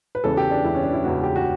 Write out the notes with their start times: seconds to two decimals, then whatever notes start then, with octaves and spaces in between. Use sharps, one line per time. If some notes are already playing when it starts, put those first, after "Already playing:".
0.15 B4
0.24 E2 C#3 E3 A4
0.37 G4
0.51 D4
0.64 E2 C#3 E3 E4
0.75 C#4
0.84 D4
0.94 E4
1.04 E2 C#3 E3 F#4
1.23 G4
1.36 F#4